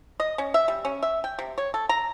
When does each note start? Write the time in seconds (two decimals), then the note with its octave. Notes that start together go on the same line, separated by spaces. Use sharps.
0.20 D#5
0.38 C#4
0.54 E5
0.68 G3
0.85 C#4
1.03 E5
1.24 G5
1.39 C3
1.58 C#5
1.74 A4
1.89 A#5